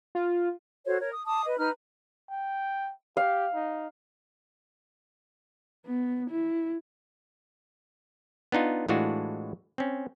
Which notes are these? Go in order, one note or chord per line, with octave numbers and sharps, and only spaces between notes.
F4
F#4 A4 C5 C#5
A#4 C#5
D#6
A5 D6 D#6
B4 D#5
D#4 B4 A#5 F6
G5
G4 F5
D#4
B3
E4
B3 D4 D#4 F4
A2 E3 G#3 D4 F4 F#4
C4 C#4